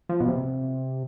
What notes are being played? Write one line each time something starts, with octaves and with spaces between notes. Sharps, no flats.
F3
B2
C3